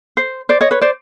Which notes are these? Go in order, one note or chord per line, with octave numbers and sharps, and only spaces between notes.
C5
C5 D5
C#5 D#5
B4 C#5
C5 D5